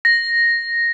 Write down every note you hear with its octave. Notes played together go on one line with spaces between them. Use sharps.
A#6